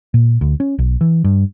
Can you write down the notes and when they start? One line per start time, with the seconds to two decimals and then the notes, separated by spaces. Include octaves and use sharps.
0.14 A#2
0.41 D2
0.60 C#4
0.79 B1
1.01 E3
1.24 G2